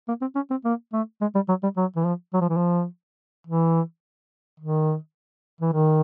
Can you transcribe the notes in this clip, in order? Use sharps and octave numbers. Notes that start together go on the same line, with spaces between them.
A#3
C4
C#4
C4
A#3
A3
G#3
G3
F#3
G3
F#3
E3
F3
F#3
F3
E3
F3
E3
D#3
E3
D#3